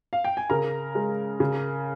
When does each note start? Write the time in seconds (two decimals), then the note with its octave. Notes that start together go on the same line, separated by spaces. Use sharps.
0.13 F5
0.24 G5
0.37 G#5
0.50 C#3 A#4 A#5
0.95 G#3
1.40 C#3